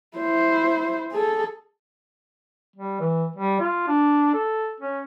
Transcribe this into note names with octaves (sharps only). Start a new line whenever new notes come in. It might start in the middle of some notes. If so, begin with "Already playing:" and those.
E4 C5
G#4 A4
G3
E3
G3
F4
D4
A4
C#4